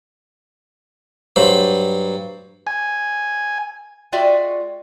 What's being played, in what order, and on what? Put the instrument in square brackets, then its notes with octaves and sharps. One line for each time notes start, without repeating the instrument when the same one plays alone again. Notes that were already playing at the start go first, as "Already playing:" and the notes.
[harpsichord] G2 F#3 C5 B5
[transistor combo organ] G#5
[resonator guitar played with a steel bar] G#3 F4 F#4 D5 E5 G5